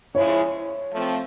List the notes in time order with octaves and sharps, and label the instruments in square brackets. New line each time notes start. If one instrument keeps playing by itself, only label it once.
[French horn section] C#3 F3 G#3 C#4 E4 [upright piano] C#5
[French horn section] F3 A3 C4